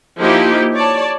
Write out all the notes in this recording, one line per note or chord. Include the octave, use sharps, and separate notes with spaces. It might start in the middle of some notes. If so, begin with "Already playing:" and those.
F3 A#3 D#4 E4 G4
C#5 D5 A5